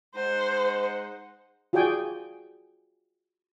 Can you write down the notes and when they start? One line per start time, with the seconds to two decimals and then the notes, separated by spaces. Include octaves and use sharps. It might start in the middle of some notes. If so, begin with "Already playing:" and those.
0.15 G#3 D#4 C5 F#5
1.73 F4 F#4 G#4 D5 G5 G#5